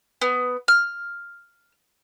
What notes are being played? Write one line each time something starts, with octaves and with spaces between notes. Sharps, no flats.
B3
F6